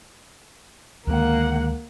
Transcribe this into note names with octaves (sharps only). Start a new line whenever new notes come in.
D2 D#3 G#3 A#3 F#5